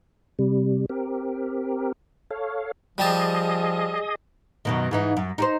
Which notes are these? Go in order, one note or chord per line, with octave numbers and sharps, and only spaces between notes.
C3 G3
C4 G4 A#4
A4 C#5 F5
F3 G3 G4 G#4 D#5 A5
F#2 B2 D#3
G#2 E3 D#4
F#2
D#4 G4 C5